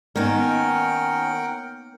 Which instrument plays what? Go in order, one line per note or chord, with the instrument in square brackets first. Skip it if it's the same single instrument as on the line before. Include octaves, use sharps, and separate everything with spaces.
[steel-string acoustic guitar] D#3 C#4 [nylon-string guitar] A#3 B3 D#4 [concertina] A#4 F#5 G5